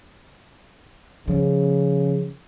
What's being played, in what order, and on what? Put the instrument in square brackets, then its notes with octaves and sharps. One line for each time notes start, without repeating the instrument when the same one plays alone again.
[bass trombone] C#3 [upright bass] F3 C#4